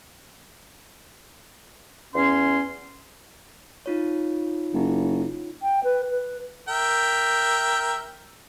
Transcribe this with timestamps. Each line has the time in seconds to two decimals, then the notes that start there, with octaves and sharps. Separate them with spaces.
2.15 E2 C#4 C6
3.86 D#4 F4 C#5
4.74 F#1
5.62 G5
5.84 B4
6.10 B4
6.68 A#4 E5 G5